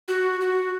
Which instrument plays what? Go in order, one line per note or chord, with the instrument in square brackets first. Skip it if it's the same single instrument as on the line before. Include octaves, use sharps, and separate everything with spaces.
[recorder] F#4
F#4